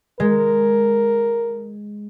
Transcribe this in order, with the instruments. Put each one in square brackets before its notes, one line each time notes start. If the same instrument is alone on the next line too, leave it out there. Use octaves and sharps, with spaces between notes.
[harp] G#3 [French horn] A#4